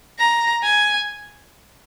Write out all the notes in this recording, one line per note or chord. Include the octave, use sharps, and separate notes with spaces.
A#5
G#5